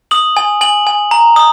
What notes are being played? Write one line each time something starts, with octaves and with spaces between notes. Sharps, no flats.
D#6 F#7
G#5
G#5 F#7
G#5
A#5
D#6